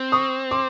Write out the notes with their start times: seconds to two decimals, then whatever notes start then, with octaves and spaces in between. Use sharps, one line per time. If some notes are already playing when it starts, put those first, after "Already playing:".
Already playing: C4
0.12 C#6 D#6
0.51 C6 D6